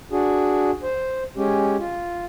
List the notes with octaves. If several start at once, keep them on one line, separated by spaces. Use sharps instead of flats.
D4 F#4 G#4
C5
G#3 C#4 G4
F4